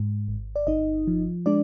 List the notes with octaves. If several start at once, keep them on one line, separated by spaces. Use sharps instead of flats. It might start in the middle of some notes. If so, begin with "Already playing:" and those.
Already playing: G#2
G#1
D5
G1 D#4 D#5
F3
G#3 D4 D5